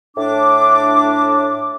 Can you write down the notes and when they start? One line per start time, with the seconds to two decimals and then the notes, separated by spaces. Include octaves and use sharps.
0.17 A2 D4 D6